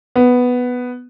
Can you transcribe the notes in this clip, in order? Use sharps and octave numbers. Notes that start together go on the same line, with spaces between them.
B3